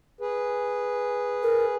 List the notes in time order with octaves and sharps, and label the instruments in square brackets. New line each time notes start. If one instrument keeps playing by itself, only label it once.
[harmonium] G#4 B4
[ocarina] A#4